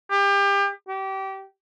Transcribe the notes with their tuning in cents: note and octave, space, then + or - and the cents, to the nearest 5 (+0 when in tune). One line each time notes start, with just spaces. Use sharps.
G4 +30
G4 -25